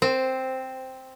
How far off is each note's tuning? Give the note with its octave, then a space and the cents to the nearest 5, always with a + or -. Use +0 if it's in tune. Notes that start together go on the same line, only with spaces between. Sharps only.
C4 +0 C5 -15